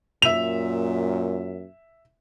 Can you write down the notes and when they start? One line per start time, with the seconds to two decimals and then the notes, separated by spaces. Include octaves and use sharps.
0.22 F#2 A#2 E5 F7